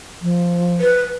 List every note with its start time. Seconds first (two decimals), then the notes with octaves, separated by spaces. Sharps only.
0.22 F3
0.80 B4